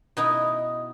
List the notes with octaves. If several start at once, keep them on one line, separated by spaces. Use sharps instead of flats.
B2 D#4 E4